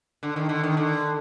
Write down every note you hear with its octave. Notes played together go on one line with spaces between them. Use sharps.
D3
D#3
D3
D#3
D3